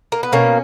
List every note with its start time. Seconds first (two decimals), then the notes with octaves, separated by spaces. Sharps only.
0.12 A#3
0.23 B3
0.32 B2 A#3 C#4